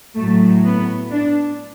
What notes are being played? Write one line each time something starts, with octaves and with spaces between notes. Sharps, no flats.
A2 F#3 A3
B3
D4